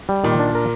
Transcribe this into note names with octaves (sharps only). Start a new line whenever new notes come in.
G3
A#2 D#3
D4
A#4